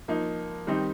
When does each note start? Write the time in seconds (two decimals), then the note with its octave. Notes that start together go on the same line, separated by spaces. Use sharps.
0.08 F3 A#3 D#4
0.67 D#3 G3 C4 D#4